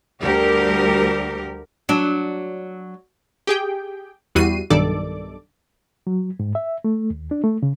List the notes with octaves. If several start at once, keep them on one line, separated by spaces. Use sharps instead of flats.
D2 G3 G4 A#4
F#3 D4
G4 G#4 G5
E2 G3 E4 F#4 C7 D#7
B1 G2 D#3 A4 D5 D6
F#3
G#2
E5
A3
D#2
D4
A3
C#3